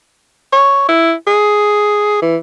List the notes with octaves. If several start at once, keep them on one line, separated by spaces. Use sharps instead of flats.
C#5
E4
G#4
E3